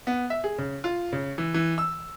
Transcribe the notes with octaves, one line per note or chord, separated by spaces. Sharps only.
B3
E5
G#4
C#3
F4
C#3
E3
E3
E6